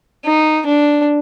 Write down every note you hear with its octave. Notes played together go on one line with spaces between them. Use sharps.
D#4
D4